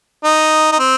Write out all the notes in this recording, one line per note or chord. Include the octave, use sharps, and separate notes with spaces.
D#4
D#4
C4